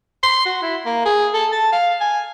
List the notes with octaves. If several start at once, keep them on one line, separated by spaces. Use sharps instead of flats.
C6
F#4
E4
A#3
G#4
A4
A5
F5
G#5